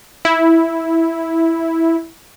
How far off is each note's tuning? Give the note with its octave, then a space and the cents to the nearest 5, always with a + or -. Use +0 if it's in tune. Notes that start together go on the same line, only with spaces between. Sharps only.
E4 -5